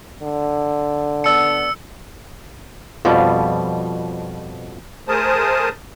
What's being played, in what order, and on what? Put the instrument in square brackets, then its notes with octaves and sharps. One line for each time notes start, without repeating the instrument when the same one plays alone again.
[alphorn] D3
[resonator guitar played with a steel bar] B3 D5 A5 [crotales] E6 C#7
[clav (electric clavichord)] F2 B2 G3 [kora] F3
[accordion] A3 G#4 A#4 C5 A5 D#6